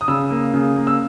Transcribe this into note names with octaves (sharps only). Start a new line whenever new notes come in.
D#6
C#3 E6
A#3
C#3
A#3
E6